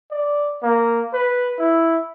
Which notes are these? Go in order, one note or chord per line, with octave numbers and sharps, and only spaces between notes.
D5
A#3
B4
E4